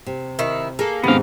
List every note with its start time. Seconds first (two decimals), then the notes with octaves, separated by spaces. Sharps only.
0.06 C3
0.39 D#3 E4
0.79 A#3 G#4 A4
1.04 G#2 C3 D#3 B3 F5